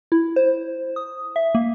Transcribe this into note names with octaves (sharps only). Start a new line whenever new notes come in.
E4
C5
D#6
E5
A#3